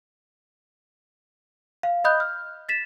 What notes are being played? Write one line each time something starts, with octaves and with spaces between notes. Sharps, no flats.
F5
D#5 B5 D#6 F#6 G6
F6
A6 B6 E7